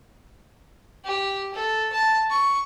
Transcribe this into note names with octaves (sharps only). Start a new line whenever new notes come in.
G4
A4
A5
C#6